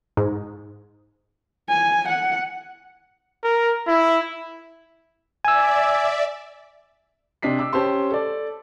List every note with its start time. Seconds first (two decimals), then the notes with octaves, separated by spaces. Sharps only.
0.17 G#2
1.69 G#5
2.08 F#5
3.44 A#4
3.88 E4
5.45 D5 E5 G#5 E6
7.42 C3 D4 D#5 B6 C7
7.59 D6 E6
7.73 C#4 G4 C5 A5 C6
8.11 A4 D5